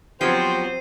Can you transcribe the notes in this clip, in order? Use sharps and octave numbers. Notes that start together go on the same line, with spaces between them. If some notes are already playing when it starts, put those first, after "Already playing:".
F3 F#3 B3 C4 G4 C5 C7 D#7